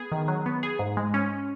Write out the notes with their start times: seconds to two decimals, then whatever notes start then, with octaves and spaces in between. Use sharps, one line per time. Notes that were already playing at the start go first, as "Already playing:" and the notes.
Already playing: B3 G#4
0.12 D#3
0.28 F#3
0.46 B3
0.63 G#4
0.79 G#2
0.97 G#3
1.14 C#4